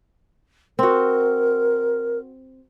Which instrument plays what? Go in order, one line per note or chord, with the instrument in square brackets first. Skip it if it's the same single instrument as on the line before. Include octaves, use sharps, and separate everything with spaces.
[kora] C4 F#4 [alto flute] A#4